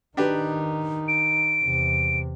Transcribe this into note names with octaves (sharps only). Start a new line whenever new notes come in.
D#3 D4 D#4 G4 B4
D7
E2 C3